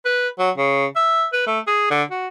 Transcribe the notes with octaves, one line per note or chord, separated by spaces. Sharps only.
B4
F#3
C#3
E5
B4
A3
G#4
D3
F#4